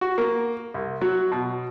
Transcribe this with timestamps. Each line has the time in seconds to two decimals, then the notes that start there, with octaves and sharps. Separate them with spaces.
0.01 F#4
0.18 A#3
0.74 C2
1.01 F#3
1.32 B2